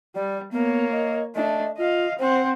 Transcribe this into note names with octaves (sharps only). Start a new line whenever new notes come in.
G3 D5
A#3 B3 C#5
D#5
A3 D4 D#5
F4 D#5 F5
C4 C5 F#5